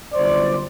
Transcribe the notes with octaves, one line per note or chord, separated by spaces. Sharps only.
G1 F#2 D3 C5 D5